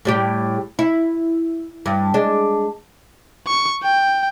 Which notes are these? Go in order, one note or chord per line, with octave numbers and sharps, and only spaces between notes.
A2 G3 G4
E4
G2
G#3 D4
C#6
G5